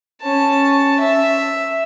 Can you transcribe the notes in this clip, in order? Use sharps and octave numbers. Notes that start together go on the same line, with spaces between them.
C#4 A5
E5